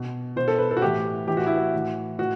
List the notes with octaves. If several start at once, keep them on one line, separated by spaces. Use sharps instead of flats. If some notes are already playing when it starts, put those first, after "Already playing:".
Already playing: B2
B2 C5
A4
B4
A4
F#4
A2 E3 G4
A2 E3 G4
F#4
E4
F#4
A2 E3
A2 F#4